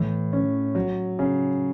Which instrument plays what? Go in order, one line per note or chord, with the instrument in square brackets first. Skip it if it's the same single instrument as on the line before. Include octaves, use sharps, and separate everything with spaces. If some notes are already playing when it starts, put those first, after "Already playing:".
Already playing: [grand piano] A2 [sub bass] E3
[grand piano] C#4
F#3
C#3